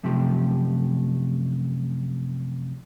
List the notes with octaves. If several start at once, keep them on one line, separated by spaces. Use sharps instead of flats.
F#2 C3 F3 A3 G4